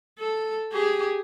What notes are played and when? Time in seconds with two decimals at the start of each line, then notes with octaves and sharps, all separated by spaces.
0.19 A4
0.72 G4 G#4